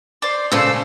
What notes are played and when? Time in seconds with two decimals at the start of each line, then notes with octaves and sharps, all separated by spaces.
0.22 C5 D5
0.52 A#2 C#3 A3 C5 E6